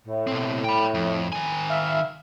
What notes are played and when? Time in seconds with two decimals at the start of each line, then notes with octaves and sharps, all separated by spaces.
0.06 A2
0.27 B2 C4
0.64 G5 B5
0.94 F2
1.33 D#3 G#5
1.71 E5 F5